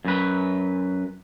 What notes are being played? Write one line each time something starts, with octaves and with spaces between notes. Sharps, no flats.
F#2 B4